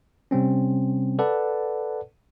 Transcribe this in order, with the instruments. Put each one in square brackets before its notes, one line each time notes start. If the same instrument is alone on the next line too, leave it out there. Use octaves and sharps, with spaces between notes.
[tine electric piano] C3 G3 C4 C#4
A4 B4 D5 F#5 A5